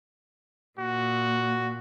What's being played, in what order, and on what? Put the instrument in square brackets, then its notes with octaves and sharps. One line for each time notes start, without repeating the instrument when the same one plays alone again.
[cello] A#2 [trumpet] F#4